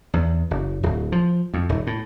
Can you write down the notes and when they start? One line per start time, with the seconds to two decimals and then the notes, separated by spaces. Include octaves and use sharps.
0.14 E2
0.51 F#1
0.83 D1
1.12 F3
1.54 F2
1.69 D#1
1.87 A2